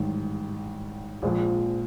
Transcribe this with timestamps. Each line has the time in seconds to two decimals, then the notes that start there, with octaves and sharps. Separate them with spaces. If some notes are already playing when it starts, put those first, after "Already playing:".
Already playing: A1 G#2 D#3 G3
1.22 A#1 A#2 F3 G#3